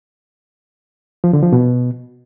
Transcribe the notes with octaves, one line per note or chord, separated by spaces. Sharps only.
F3
D3
F3
B2